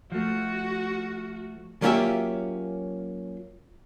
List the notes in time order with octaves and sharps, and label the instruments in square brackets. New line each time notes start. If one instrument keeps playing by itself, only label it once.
[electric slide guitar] F3 A3 [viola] F#4
[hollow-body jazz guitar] F#3 A#3 C#4 F4 G4 E5